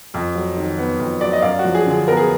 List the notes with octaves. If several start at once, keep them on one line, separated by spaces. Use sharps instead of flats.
F2
F#3
D#3
B3
F2
F#3 D5
D#5
F#2 D5 F5
F#4
F3
G#4
D3 G#4
B3 A#4
G#4